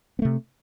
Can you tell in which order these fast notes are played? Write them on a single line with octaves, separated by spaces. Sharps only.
B3 A3 C3